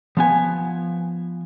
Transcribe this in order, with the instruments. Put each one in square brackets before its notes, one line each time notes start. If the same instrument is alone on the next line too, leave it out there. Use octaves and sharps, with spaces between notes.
[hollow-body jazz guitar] F3 B3 G#5